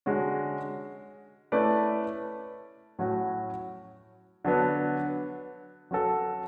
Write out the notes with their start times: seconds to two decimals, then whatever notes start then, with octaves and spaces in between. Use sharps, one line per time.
0.06 D3 G#3 C#4 F#4
1.52 A3 C#4 E4 B4 D5
2.99 A2 F#3 C#4 F#4
4.45 D3 F#3 B3 D4
5.91 F#3 C#4 F#4 A4